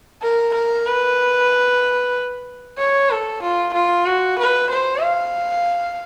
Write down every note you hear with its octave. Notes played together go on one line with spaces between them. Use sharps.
A#4
A#4
B4
C#5
A4
F4
F4
F#4
B4
C5
F5